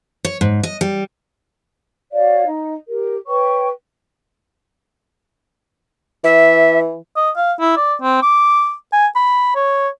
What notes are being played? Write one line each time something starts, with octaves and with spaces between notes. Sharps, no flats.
C#5
G#2
D#5
G3
F#4 C#5 D5 F5
D#4 D#5
G4 A#4
B4 C#5 G5 C#6
E3 E5
D#5
F5
E4
D5
C4
D6
G#5
B5
C#5